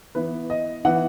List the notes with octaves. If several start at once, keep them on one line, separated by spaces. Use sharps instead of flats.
E3 B3 B4
D#5
E3 B3 F#5